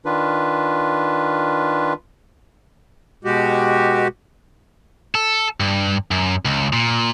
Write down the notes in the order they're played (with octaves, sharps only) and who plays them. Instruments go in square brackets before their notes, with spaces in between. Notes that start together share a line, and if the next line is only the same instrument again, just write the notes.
[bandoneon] D#3 D4 F4 B4
[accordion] B2 G#3 F#4 G4
[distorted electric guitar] A4
G2
F#2
C#2
A#2